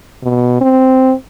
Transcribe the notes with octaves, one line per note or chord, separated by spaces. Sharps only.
B2
C4